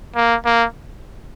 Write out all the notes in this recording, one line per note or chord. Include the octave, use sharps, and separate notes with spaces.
A#3
A#3